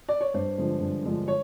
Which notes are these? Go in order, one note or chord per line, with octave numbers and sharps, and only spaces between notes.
D5
C#5
G2 C5
D3 F3 G#3
G2
D3 F3 G#3
C#5